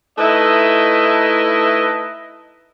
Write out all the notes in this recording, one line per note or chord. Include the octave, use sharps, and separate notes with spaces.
A3 D#4 E4 B4 D#5 E5